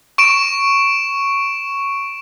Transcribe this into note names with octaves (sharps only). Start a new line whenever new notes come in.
C#6 D7 E7